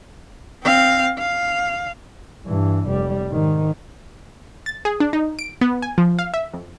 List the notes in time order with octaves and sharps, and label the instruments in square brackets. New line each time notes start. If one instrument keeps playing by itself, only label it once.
[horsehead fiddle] C4 F5
F5
[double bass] G2 E3
F1 G3
G#2 D#3
[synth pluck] A6
G#4
D4
D#4
D7
B3
G#5
F3
F5
E5
F2